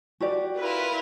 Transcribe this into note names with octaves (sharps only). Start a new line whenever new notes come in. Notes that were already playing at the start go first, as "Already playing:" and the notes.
F#4 G4 D5
E4 F4 A#4 B4